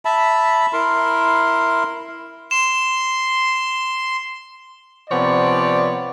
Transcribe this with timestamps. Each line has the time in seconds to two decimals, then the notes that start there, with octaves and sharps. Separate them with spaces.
0.05 E5 A5 B5
0.73 E4 A#4 C6
2.51 C6 E7
5.10 C3 F3 B3 C#5 D5